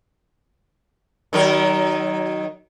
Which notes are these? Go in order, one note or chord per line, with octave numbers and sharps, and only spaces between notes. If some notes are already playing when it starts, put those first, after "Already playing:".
D#3 F#3 A#4